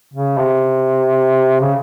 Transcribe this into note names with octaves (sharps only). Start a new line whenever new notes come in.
C#3
C3
C#3